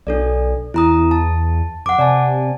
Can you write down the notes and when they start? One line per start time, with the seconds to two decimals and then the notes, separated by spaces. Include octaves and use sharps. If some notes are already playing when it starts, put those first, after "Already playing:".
0.07 B1 D4 A4 D5
0.74 E2 E4 A#5 D#6
1.11 A5
1.86 F2 F#5 D6
1.99 C3 D5 G#5 A5